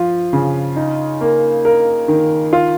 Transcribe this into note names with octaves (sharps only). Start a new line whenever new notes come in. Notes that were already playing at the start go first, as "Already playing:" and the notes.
Already playing: F3 F4
C#3
D#4
A#3
A#4
D#3
F4